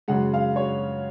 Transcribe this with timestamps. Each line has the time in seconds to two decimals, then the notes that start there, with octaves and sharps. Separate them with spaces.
0.08 F#2 C#3 G#3 F#5
0.34 F5
0.56 C#5